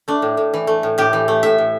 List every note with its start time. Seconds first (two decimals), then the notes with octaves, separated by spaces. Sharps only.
0.08 A3 D4
0.22 A2
0.37 A2
0.54 E3
0.67 A3
0.83 A2
0.98 A2 G4
1.13 E3
1.28 A3
1.43 A2 E5
1.58 A2